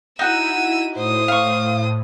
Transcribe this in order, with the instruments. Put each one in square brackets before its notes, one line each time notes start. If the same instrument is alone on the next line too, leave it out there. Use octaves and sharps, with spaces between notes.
[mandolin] D#4 F#4 F#5 [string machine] E4 [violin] E6 D#7
[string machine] A2 [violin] C5 D#6
[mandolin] F5 C#6